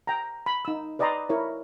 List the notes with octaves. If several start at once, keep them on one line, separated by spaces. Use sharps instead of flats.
G5 A#5
B5
D#4 E6
B4 D5 D#5 G5 A#5 C6
E4 A#4 C#5